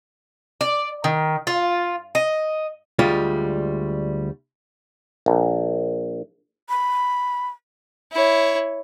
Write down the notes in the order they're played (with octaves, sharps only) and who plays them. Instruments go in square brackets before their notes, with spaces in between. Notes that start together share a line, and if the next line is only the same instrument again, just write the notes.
[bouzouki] D5
D#3
F4
D#5
[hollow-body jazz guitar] D2 G3 G#3 F4
[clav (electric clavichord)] A#1
[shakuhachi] B5
[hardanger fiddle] E4 C#5